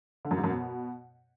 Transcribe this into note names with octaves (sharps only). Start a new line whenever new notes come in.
D3
F#2
G#2
F#2
B2